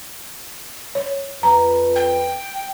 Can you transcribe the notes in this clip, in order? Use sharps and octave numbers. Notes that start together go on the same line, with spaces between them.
C#5
F2 B4 A#5
G5